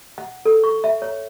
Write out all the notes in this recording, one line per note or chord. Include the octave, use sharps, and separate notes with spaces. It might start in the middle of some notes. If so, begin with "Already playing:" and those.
F#5
A4
C#6
E5
C#5